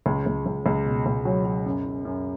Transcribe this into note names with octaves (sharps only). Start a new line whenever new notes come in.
C#2
C#2
C#2
C#2
B2
C#2
F#3
F#3
F#2
F#2
F#2